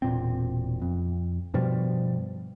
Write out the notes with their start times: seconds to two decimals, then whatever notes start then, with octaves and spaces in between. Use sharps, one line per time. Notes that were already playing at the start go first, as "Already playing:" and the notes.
0.02 E1 A#2 C4
0.82 F2
1.54 G2 B2 F3 G3